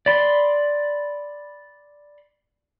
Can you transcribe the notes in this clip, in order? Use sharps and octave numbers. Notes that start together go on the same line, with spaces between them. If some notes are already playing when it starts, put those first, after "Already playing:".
D5 B5 C6